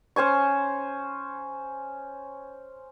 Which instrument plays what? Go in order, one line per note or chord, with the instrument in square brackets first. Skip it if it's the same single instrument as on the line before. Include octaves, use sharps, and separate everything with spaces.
[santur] C#4 C5 G#5 C#6